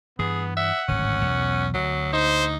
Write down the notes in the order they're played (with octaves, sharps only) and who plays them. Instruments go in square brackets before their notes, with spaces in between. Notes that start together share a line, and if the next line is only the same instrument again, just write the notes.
[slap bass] G2 E3 [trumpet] B3 [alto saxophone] G#4
[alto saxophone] E5 [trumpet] F#5
[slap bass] D1 G#1 G#2 [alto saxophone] C#4
[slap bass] B1 E2
[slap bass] D2 D3 [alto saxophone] F#3
[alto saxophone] D#4 [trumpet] C5